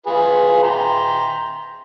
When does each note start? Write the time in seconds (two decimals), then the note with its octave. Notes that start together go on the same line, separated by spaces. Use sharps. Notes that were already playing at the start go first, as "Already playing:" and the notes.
0.06 F4 G#4 B4
0.63 G5 A#5 C6